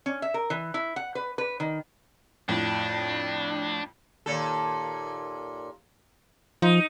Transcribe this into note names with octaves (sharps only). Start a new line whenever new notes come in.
C#4
E5
A#4
E3
E4
F#5
B4
B4
D#3
F2 A2 D4
D#2 A#2 A4
F3 D#4